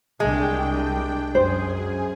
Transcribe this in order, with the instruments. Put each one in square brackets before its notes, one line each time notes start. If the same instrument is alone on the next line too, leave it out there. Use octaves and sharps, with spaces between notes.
[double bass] C2 [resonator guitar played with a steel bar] G#3 [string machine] D4 G5
[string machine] F#2 G#4 [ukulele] C5